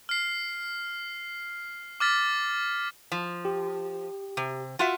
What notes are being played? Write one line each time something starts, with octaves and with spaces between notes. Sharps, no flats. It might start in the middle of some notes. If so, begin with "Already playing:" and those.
F6 C7
D6 F6 A6 B6
F3
G4
C3
F4 F#4 E5